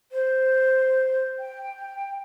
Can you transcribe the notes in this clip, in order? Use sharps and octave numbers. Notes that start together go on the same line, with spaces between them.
C5
G5